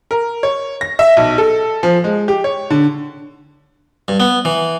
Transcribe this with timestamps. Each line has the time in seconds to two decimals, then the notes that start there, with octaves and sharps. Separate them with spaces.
0.11 A#4
0.43 C#5
0.81 A#6
0.99 E5
1.17 B1
1.38 A4
1.83 F3
2.04 G#3
2.28 G4
2.44 C#5
2.70 D3
4.08 G2
4.20 B3
4.45 E3